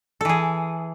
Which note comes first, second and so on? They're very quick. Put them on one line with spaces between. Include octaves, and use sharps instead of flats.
A4 E3 G#4